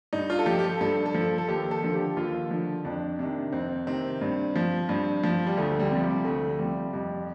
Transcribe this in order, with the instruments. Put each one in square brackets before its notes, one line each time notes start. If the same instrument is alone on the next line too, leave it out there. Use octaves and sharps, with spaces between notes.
[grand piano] G2 D#4
F4
A4
F3 G4
G4
A4
G2 A4
A4
F3
A4
D#2 G4
A4
D3 F3
G4
D#2 F4
D3 F3
F2 D4
C3 D#3 D4
F2 C4
C3 D#3 C4
G2
F3
G2
F3
G3
D2 A3
G3
C3 F3
G3
D2 A3
C3 F3 G3
F2 G3